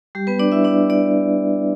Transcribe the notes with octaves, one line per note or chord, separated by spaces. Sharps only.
G3 G4
B3 B4
D4 D5
E4 E5
D4 D5
D4 D5